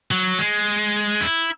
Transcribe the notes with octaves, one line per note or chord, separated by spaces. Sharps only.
F#3
G#3
E4